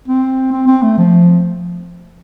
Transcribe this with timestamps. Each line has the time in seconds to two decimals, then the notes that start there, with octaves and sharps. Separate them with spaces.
0.08 C4
0.52 C4
0.68 C4
0.83 A3
0.98 F3